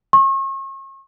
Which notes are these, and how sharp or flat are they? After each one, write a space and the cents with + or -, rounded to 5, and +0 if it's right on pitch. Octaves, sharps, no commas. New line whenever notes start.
C#6 -40